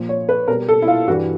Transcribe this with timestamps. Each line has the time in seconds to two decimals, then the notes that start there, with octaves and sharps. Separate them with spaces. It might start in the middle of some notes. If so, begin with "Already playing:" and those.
Already playing: A#2 F3
0.09 C#5
0.29 B4
0.48 B2 G3 A#4
0.69 A4
0.82 E4
0.88 F4
1.07 G2 E3 G3 F#4